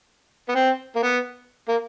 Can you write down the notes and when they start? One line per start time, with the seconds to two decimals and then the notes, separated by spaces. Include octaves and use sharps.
0.49 B3
0.55 C4
0.95 A#3
1.02 B3
1.68 A#3